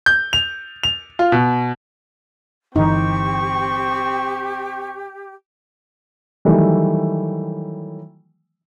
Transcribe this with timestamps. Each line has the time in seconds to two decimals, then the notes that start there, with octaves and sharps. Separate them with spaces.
0.06 G6
0.33 F7
0.83 F7
1.19 F4
1.32 B2
2.76 G1 E3 C4 D#4 G4 C#6
6.45 D#3 E3 F#3 G3 A3